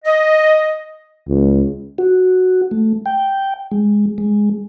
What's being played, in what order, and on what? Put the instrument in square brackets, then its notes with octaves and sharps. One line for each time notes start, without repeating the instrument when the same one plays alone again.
[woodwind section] D#5
[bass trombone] C#2
[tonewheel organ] F#4
A3
G5
G#3
G#3